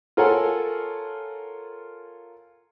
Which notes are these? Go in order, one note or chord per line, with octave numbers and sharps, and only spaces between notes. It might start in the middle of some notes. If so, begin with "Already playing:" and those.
F4 A4 A#4 C#5 F#5 G#5